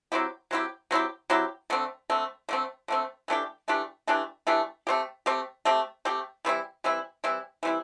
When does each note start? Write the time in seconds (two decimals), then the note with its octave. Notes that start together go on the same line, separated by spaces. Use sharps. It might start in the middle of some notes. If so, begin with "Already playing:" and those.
0.12 F#3 C4 E4 G4
0.51 F#3 C4 E4 G4
0.91 F#3 C4 E4 G4
1.30 F#3 C4 E4 G4
1.70 D3 A3 C4
2.10 D3 A3 C4
2.49 D3 A3 C4
2.88 D3 A3 C4
3.28 E3 A3 D4 G4
3.68 E3 A3 D4 G4
4.07 E3 A3 D4 G4
4.47 E3 A3 D4 G4
4.87 A3 C4 G4
5.26 A3 C4 G4
5.65 A3 C4 G4
6.05 A3 C4 G4
6.45 E3 G3 C4 E4
6.84 E3 G3 C4 E4
7.24 E3 G3 C4 E4
7.63 E3 G3 C4 E4